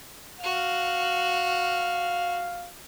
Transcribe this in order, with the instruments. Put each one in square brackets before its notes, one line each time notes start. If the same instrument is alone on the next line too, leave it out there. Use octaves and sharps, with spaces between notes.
[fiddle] F#4 F6 [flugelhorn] F5